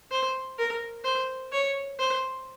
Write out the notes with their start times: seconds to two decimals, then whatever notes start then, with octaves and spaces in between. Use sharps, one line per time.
0.11 C5
0.58 A#4
1.04 C5
1.52 C#5
1.99 C5